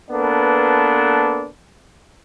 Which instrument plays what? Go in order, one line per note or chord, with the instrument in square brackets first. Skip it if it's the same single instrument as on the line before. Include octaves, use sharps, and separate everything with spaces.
[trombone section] A#3 B3 D4 A4 B4